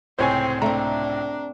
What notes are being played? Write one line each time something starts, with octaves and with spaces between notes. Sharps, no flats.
C#2 A2 C3 C4 C5 C#5 G#5
A3 C4 D4 A#5